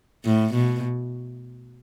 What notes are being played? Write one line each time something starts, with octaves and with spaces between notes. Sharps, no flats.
A2
B2